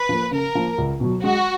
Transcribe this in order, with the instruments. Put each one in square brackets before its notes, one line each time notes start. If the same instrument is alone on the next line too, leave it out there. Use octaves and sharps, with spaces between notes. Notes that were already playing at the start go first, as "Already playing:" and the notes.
Already playing: [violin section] B4
[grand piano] F3 A#3
[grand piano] C#3 [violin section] A#4
[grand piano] F3 A#3
C#2
B2 F#3
[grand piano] G#3 [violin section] F#4